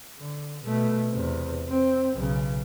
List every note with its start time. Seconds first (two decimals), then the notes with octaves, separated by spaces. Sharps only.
0.19 D3
0.65 B2 A3
1.10 E2 C3
1.69 C4
2.15 B1 C#3